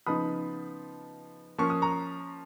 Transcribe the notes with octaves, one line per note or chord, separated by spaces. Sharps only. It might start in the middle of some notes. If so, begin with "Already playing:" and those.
C#3 F3 B3 D#4 B5 D#6
F3 A#3 C#4 C#6
D#6
A#5 C#6